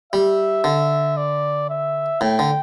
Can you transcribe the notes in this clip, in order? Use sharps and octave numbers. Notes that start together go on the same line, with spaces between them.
G3 E5
D3
D5
E5
A2 G5
D3